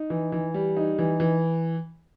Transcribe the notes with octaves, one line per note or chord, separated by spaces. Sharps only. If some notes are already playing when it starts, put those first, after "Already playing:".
Already playing: D#4
E3
E3
G3
D#4
E3
E3